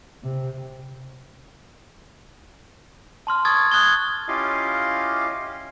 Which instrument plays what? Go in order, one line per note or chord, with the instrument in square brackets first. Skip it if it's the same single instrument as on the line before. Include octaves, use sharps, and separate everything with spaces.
[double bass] C3
[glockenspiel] A5 C6 F6
C#6 D#6 F6 G#6 A6
D#6 F#6 G#6 A6 G7
[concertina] C#4 E4 F4 G4 D#5 F5